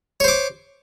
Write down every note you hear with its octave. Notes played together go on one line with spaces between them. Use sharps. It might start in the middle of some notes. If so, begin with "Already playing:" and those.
C5 C#5 D6